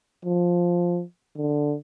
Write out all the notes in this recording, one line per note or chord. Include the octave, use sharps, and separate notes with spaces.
F3
D3